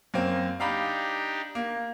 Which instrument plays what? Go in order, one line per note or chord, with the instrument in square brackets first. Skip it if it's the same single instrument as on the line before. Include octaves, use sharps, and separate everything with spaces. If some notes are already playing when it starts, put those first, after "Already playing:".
[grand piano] F#2 A#3 C4
[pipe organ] D4 D#4 G4 [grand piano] F5 A#5 B5
[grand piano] A#3